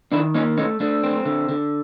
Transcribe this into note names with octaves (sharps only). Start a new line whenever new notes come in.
D#3 D4 E4
A#3 C#4 D#4
A3 C#4 D#4
A3 D4
C4
D3
D3